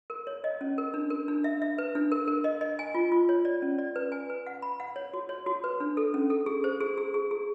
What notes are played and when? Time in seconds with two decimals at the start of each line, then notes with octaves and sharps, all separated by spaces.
0.10 A#4
0.27 C#5
0.44 D#5
0.61 C#4
0.78 A#4
0.94 D4
1.10 A#4
1.28 D4
1.44 E5
1.62 E5
1.78 B4
1.95 D4
2.12 A#4
2.28 A#4
2.44 D#5
2.61 D#5
2.79 G#5
2.95 F4
3.12 F4
3.29 C#5
3.45 D5
3.62 C#4
3.78 D5
3.96 B4
4.12 G#5
4.30 B4
4.47 F#5
4.62 B5
4.80 F#5
4.96 C#5
5.14 F#4
5.29 C#5
5.46 F#4
5.64 B4
5.80 D4
5.97 A4
6.14 C#4
6.30 A4
6.46 G#4
6.64 C5
6.80 G#4
6.98 G#4
7.14 G#4
7.31 G#4